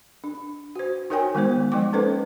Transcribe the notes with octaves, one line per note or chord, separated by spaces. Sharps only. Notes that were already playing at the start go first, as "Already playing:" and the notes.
D4
F#4 C5
D#4 F#4 A#4 C#5 G5 G#5
D#3 G#3 B3 C5
F3 G#3 D#4 G5 D6
A#3 C#4 D#4 A4 B4 C5